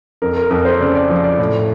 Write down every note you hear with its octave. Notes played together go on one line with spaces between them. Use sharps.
F2 A#4
A#4
F2 A#4
C5
C#3 D5
D5
F3
D5
A2